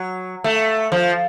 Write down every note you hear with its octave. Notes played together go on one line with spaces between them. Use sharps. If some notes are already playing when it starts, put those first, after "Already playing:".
Already playing: F#3
A3
F3